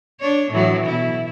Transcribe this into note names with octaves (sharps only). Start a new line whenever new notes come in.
D4 C#5
A2 E3 F#3
B2 E4